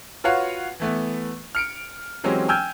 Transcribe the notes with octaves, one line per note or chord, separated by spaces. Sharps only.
F4 F#4 B4 C#5 F5 F#5
E3 A3 B3
F6 C#7 D7
E3 F#3 G#3 C4 C#4 G4
G5 G#5 E6 F6 G6 G#6